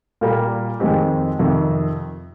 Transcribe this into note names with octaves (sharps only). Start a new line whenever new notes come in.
A#2 G3 A#3
F2 D#3 G#3 C4 G4
F2 C3 D#3